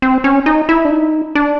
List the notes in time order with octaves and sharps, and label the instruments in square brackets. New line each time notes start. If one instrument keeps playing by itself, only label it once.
[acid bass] C4
C#4
D#4
E4
D4
D#4
D4